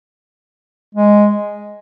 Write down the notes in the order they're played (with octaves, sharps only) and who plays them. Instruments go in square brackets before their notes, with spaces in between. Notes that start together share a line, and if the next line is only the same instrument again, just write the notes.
[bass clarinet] G#3